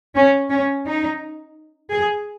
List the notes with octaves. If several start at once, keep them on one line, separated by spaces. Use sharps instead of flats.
C#4
C#4
D#4
G#4